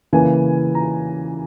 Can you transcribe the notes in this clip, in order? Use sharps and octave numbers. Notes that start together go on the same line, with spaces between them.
C#3 E3 A#3 G#5
A#5